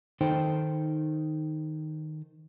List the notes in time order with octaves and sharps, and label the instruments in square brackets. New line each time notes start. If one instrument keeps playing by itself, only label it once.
[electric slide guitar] D#3 D#4 A4 C5 G5